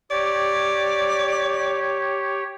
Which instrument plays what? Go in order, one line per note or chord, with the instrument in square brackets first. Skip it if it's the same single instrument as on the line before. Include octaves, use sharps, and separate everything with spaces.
[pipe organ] G4 C#5 [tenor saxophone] D5